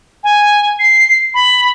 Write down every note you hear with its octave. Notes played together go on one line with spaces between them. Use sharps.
G#5
C7
B5